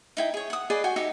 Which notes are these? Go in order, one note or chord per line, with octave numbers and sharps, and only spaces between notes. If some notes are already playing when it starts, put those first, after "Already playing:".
D#4 E4 G5
G#4 C#5
F#5 D#6
G#4 B4 D5 D#5
F#4 G5 G#5
D#4 F#4 G4 E5